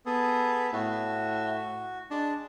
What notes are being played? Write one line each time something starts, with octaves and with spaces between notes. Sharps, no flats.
B3 G#4 A4
A2 F#4
G#3 D4 A5